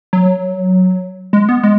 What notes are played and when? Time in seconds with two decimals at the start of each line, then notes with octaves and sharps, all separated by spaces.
0.13 F#3
1.33 G#3
1.49 B3
1.63 G#3